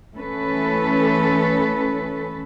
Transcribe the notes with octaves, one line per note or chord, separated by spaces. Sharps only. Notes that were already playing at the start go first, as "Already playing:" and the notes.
E3 A3 C#4 A4 B4